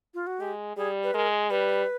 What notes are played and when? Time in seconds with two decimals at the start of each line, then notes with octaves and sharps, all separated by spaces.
0.14 F4
0.27 F#4
0.40 G#3 G4
0.77 G3 G#4
1.04 B4
1.14 G#3 A#4
1.50 G3 B4